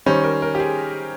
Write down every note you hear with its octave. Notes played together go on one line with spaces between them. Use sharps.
D#3 G3 C#4 C5
A#4
A#4
G4
G#4